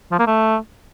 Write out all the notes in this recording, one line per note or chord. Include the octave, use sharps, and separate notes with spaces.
F3
A#3
A3